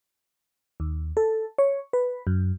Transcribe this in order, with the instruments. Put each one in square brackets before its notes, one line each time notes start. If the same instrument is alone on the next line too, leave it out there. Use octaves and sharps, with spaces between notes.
[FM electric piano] D#2
A4
C#5
B4
F#2